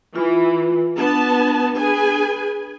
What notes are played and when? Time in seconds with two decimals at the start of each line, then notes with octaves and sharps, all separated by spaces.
0.16 E3 F4
0.98 B3 D4 A5
1.77 G#4 B4 G#5